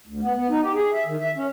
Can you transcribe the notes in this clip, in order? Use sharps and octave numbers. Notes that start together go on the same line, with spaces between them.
D2
B3
B3
D#4
G4
G#4
E5
D#3
E5
C#4